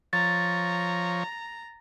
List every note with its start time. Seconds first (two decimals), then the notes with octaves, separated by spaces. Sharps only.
0.13 F3 C#5 A#5 A6